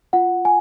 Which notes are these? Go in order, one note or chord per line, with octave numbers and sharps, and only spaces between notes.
F4 F#5
G#5